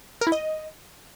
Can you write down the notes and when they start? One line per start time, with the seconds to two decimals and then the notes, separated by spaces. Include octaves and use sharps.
0.21 A#4
0.27 E4
0.32 D#5